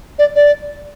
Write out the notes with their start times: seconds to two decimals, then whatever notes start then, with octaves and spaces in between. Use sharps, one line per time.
0.19 D5
0.36 D5